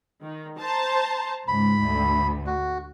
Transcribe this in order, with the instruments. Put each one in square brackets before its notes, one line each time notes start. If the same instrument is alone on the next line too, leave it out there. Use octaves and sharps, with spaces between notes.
[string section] D#3
C5 A5 A#5
[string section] C#2 G#2 [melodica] B5
[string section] D2
[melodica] F#4